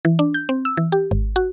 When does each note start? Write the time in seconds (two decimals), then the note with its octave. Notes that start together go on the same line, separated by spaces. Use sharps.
0.05 E3
0.19 D4
0.34 G6
0.49 C4
0.65 E6
0.77 E3
0.92 G4
1.11 G#1
1.36 F#4